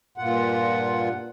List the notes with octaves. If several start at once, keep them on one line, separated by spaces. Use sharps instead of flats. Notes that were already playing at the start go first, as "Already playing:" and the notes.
G2 A#2 F4 F#5